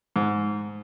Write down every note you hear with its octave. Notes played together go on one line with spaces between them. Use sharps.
G#2